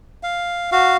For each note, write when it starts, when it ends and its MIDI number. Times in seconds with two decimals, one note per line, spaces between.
0.23 0.70 77
0.72 0.97 66
0.72 0.97 77